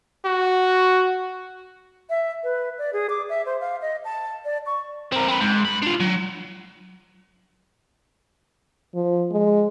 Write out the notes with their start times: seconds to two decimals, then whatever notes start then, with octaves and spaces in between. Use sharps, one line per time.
0.25 F#4
2.10 E5
2.44 B4
2.79 D5
2.93 G#4
3.10 D6
3.29 E5
3.46 C5
3.61 F5
3.82 D#5
4.05 A5
4.45 D5
4.66 C#6
5.13 C4 A#4
5.29 C4 B4
5.41 G#2
5.65 G2 B5
5.82 D4 F4
6.00 F#3
8.94 F3
9.31 G#3